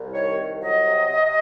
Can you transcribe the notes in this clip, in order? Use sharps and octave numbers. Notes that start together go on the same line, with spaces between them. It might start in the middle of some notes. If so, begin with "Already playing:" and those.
Already playing: C2
D#3 C#5
C2
F#3 D#5
C3
C3